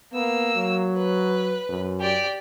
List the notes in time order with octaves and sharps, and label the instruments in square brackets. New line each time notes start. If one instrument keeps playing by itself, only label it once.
[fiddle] A#3 E6 [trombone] B3
[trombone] F#3
[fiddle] B4
[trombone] F#2
[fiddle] G4 D5